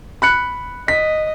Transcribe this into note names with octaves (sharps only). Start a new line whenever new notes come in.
B5 F#6 C#7
D#5 B6